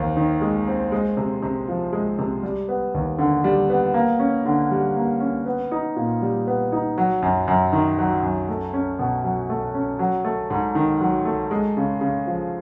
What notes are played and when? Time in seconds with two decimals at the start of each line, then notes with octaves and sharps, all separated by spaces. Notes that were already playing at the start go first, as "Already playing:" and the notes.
Already playing: D#2 C4
0.17 D#3
0.41 G#3
0.68 C4
0.92 G#3
1.17 C3
1.43 C3
1.68 F3
1.93 G#3
2.19 C3
2.43 G3
2.68 B3
2.94 D#2
3.18 D3
3.44 G3
3.70 B3
3.94 A#3
4.19 C#4
4.45 D3
4.71 G3
4.96 A#3
5.20 C#4
5.46 B3
5.72 D#4
5.96 A#2
6.22 G3
6.47 B3
6.72 D#4
6.98 F#3
7.22 F#2
7.48 F#2
7.73 D#3
7.98 F#3
8.23 F#2
8.49 A3
8.73 C#4
8.99 B2
9.24 F#3
9.50 A3
9.74 C#4
9.99 F#3
10.25 A3
10.50 G#2
10.75 D#3
11.01 F#3
11.25 A3
11.51 G#3
11.77 C#3
12.01 C#3
12.27 F3